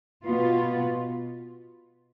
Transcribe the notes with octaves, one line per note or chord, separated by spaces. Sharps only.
B2 B3 F4